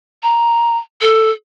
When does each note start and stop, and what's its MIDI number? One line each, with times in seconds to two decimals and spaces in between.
0.23 0.78 82
1.01 1.31 69